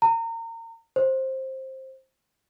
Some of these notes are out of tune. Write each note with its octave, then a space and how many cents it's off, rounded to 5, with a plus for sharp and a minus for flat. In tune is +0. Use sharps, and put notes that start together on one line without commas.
A#5 -30
C5 +15